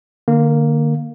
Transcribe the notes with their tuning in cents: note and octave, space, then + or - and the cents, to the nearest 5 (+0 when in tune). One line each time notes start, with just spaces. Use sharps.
D3 +35 A#3 +0